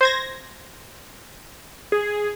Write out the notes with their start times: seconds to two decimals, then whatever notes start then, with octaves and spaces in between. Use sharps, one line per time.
0.01 C5 G#6 A#6
1.92 G#4